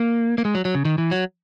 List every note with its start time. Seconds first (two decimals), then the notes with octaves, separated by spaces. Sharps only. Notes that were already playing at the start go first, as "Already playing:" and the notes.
Already playing: A#3
0.38 A#3
0.45 G#3
0.55 F#3
0.65 F#3
0.75 C#3
0.85 D#3
0.98 E3
1.11 F#3